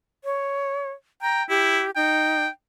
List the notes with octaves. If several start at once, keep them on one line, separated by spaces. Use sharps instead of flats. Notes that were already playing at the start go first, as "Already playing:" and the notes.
C#5
G5 A#5
E4 G4
D#4 G5